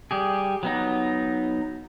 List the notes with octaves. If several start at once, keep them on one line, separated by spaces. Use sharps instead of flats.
G3 G4 G#4
F#3 B3 D#4